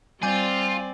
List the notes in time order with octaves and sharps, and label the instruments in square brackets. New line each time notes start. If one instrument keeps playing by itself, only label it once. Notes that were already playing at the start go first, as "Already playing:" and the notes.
[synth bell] G3 G#5 D#7 [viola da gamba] C4 D5 [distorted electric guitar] F4